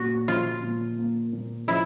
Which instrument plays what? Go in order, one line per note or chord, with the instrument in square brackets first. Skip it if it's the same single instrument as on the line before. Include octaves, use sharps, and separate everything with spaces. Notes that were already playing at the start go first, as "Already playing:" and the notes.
Already playing: [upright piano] A#2 A#3 [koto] F#4
[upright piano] F3 [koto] F4
[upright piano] A#2
A#3
A#2
[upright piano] F3 [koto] E4